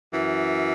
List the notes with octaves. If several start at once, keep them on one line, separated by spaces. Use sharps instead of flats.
F#2 E3